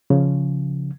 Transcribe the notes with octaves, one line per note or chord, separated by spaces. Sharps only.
C#3 F3